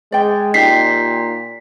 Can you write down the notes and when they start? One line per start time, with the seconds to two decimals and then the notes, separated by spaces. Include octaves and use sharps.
0.12 G#3 D5 G5
0.54 A#2 D#4 G4 B6 C7